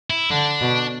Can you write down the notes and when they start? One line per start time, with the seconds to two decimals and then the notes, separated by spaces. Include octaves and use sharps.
0.10 E4
0.30 D3 D4
0.61 B2